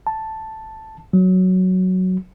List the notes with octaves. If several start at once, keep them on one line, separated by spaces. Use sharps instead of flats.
A5
F#3